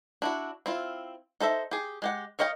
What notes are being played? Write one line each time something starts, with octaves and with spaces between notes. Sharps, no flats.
D4 E4 F#4
C4 E4 F4
D#4 A4 C5 E5
G4 G#4
G#3 G4 F#5
A#4 C#5 D#5 F5 G5